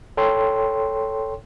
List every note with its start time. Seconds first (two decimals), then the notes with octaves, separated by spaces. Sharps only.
0.17 A4 C#5 G5 C6